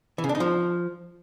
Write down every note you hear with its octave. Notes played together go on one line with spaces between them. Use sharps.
E3
C#3
D4
D#4
F3